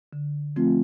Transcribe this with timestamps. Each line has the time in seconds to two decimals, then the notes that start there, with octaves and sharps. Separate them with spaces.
0.13 D3
0.56 F3 A3 C4 F4